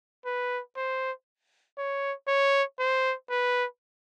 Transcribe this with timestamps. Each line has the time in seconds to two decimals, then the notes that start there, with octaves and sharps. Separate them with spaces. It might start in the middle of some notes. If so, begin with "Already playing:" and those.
0.25 B4
0.76 C5
1.78 C#5
2.28 C#5
2.79 C5
3.30 B4